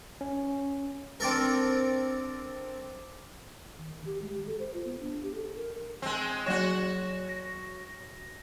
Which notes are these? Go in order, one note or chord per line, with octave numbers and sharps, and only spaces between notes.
C#4
C4 D4 A4 A#4
D#3
G4
G#3
G4
A4
C5
F4
B3
D4
G4
A4
A#4
G#3 C4
F#3 F#4 C#5 A#6 E7
A#6